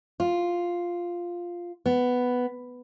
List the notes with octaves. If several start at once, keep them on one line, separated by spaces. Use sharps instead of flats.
F4
B3